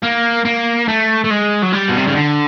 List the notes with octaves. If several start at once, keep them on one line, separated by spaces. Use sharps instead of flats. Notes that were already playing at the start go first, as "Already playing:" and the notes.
A#3
A#3
A3
A3
G#3
F#3
G3
B2
C3
C#3
D3